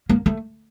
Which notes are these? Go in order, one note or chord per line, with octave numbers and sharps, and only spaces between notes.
A#3
A3